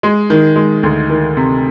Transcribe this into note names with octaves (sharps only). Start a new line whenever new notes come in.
G#3
D#3
G#3
D2
D#3
C3